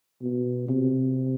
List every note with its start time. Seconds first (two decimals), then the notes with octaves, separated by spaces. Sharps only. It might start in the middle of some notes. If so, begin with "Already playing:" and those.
0.22 B2
0.69 C3